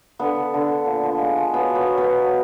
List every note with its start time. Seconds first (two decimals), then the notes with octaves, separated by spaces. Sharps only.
0.19 D3 B3
0.36 D3
0.54 D3
0.69 D3
0.86 A#2
1.03 F3
1.19 G#3
1.37 F3
1.53 F#3 B3
1.70 F#3
1.75 B3
1.86 F#3
1.98 B2 B3
2.19 F#3